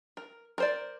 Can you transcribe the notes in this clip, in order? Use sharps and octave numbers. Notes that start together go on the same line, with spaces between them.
A#4
A#4 C5 D5